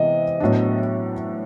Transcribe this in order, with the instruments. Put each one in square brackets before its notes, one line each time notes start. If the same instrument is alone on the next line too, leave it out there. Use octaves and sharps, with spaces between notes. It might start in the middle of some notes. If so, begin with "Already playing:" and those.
Already playing: [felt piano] C3 E3 G#3 B3 [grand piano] D#5
[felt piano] A2 F#3 B3 D4